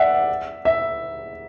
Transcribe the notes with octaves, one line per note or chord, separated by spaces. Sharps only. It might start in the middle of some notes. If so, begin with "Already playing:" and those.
Already playing: D5 E5 F#5
E5